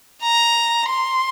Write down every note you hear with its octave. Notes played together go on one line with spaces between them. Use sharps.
A#5
C6